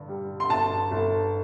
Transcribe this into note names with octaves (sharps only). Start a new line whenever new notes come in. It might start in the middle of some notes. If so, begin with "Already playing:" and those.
Already playing: G2 D3
G3
C6
G1 A5
G1